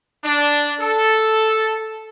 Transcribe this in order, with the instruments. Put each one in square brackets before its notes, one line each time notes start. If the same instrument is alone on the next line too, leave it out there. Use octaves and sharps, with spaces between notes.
[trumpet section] D4
A4